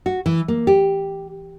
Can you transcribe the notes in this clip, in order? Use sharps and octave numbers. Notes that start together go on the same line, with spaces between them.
F#4
E3
A#3
G4